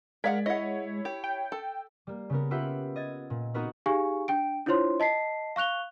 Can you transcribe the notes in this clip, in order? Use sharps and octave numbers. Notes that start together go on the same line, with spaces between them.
G#3 A#4 D5 F5 F#5 G#6 B6
E4 C#5 D#5 F#5
G4
G5
A4
G3 A#3
C#3 B3 A#4
F4 G4 B4 E5 F#5 G5
D#5 G#6 A6
A#2
B3 C4 D#4 F#4 A#4 B4
D#4 G4 G#4 F5 G#5 C#6
D4 G5 D7
D4 E4 F4 C5 C#5 C6
D#5 A5 B6 C7
F5 C#6 F#6 F7 G7